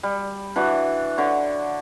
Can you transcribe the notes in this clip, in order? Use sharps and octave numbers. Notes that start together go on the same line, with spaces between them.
G3
E3 D4 F#4
D3 C#5